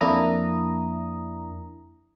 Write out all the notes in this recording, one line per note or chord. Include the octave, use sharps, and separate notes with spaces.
F2 A#3 D4 E4 A#5 D#6